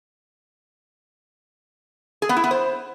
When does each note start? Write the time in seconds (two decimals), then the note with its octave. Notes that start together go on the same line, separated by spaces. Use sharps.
2.22 G#4
2.29 B3
2.36 E4
2.44 B3
2.51 C5